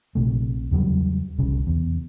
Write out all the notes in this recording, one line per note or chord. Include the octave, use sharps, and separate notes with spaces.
A#1 C3 A3
E2 C#3 F#3 G3
E1 C2 C#3
E2